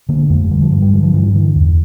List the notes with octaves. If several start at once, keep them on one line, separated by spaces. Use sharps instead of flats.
D3 A#3
F2 A3
D3 G3
F3
G2 G3
G3
D3 F3
F3
G2 E3
D3 E3
E2